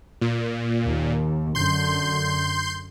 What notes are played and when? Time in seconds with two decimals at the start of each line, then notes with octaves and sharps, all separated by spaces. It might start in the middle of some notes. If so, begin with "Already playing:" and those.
0.21 A#2
0.86 D#2
1.55 F#2 D3 C6 G6